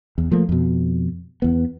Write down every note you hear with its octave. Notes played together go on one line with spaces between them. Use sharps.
E2
F3 A3 A#3
F2 B2
E2 B3